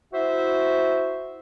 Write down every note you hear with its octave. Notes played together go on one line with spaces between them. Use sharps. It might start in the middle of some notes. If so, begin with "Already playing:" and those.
E4 F#4 C5 E5